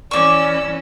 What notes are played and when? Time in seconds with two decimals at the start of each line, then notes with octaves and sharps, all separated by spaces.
0.11 E3 C#4 D5 C#6 D6 E6